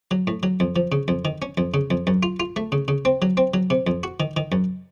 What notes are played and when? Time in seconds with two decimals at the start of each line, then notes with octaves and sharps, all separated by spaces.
0.11 F#3
0.27 A2
0.43 F#3
0.60 F2
0.76 F3
0.92 C#3
1.08 F2
1.25 D#3
1.42 C#4
1.57 F2
1.74 C#3
1.91 F2
2.07 F#2
2.23 F4
2.40 F4
2.56 A3
2.72 C#3
2.88 C#3
3.05 C4
3.22 F#3
3.37 C4
3.54 F#3
3.70 C3
3.87 F2
4.03 F#4
4.20 D#3
4.37 D#3
4.52 F#2